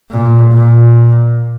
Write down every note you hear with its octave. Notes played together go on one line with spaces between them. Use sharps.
A#2
A#2